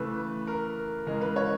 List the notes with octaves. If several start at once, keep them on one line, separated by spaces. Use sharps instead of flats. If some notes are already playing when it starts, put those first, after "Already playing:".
Already playing: C#3 E3 A3 B4
A#4
C#3 E3 G#3 A#4
B4
C#5